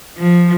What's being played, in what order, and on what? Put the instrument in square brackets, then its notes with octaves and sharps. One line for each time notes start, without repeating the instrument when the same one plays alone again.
[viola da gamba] F3